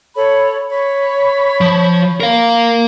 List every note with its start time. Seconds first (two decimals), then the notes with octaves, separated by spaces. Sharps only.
0.15 A4 C#5 B5
0.71 C#5 B5 C#6
1.61 F3
2.20 A#4 F5